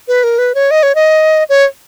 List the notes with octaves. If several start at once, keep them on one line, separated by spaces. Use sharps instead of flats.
B4
A#4
B4
C#5
D#5
C#5
D#5
C#5